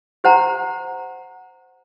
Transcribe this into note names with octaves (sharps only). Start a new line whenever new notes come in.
G4 C5 F#5 A#5